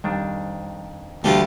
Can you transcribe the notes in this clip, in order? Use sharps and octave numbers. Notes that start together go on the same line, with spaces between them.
F2 D#3 G3 D4
D2 E3 G3 A3 A#3 F4